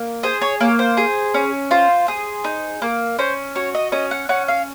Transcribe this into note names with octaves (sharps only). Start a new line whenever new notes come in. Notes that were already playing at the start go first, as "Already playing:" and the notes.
Already playing: A#3
G#4 C5
C#5
A#3 C#5
C5
G#4
C#4
F4 C5
G#4
D#4
A#3
C#4 C5
F#4 C#5
D#5
C#4 D#5
F#5
C#4 F#5
F5